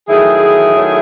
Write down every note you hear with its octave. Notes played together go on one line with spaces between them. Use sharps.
D#3 F#3 A3 E4 G#4
D#3 F#3 A3